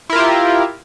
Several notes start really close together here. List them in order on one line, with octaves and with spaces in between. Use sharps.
E4 A#4 F4 G4